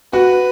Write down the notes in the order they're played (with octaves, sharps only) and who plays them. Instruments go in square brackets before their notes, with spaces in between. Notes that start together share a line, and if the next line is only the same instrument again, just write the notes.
[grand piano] F#4 [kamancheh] B4